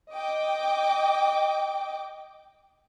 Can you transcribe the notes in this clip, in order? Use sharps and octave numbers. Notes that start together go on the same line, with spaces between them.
D#5 G5 D6